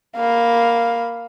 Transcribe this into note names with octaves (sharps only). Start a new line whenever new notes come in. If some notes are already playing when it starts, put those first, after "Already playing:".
A#3 F5 B5